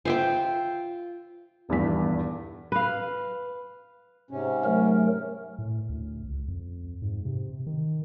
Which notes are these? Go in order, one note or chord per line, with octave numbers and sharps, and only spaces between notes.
F4 C5 E5 G5
D#1 E2 G2 E3 B6
B4 F5
G#2 C3 C#4
F#3 A3 A#4
A2
D2
C#2
F2
G#2
C3
D#3